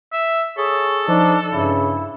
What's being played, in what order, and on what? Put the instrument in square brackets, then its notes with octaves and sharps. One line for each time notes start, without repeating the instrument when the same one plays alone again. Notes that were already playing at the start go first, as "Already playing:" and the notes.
[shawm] E5
[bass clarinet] G#4 [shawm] A4 [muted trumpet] C#5
[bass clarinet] F3 [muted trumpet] D4 [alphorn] D#4
[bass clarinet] G2 [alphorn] C#3 [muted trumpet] E4